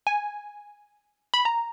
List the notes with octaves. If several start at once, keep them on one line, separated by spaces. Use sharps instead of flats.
G#5
B5
A#5